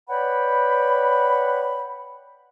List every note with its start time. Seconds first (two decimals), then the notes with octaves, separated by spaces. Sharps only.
0.09 B4 C#5 D5 F#5 G5 B5